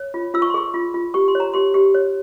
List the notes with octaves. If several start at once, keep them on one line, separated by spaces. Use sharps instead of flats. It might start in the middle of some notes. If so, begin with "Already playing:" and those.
Already playing: C#5
F4
F4 E6
C#6
C6
G#4 C#6
F4
F4
G4 C#6
C6
C#5
A#5
G4 C6
G4
C#5